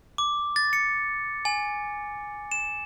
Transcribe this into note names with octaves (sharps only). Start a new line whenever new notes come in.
D6
A6
C#7
G#5
E7